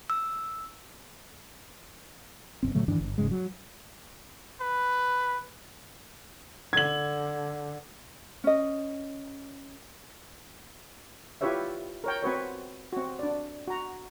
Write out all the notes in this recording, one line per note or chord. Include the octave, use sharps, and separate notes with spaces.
E6
F#1 A2 C4
A#2 D3 F#3 A3
G2 D#3 E3 D4
G1
E1 G#2 C#3 G#3
F#3
B4
D3 G#6 F#7
C#4 D#5
E4 F4 G4 B4 C#5 E5
A#4 C#5 G5
C4 F#4 B4 C#5
C4 F#4
D4 D5
F#4 A#5